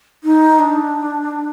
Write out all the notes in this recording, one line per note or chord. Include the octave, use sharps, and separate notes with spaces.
D#4
D4